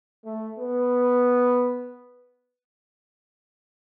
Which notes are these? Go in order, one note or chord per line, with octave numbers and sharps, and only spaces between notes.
A3
B3